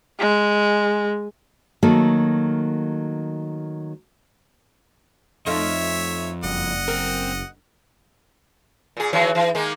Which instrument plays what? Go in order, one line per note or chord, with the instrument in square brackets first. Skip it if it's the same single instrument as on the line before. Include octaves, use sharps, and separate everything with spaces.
[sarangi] G#3
[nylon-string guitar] D#3 F#3 A3 A#3 A4
[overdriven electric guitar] F2 [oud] A3 D#4 F4 [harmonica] C#5 E5
[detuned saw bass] F#1 [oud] G2 [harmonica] D#5 F#5
[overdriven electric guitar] C4 [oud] A#4
[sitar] A#2 G#4
D#3 E3 F#3
E3
D#3 G#3 A#3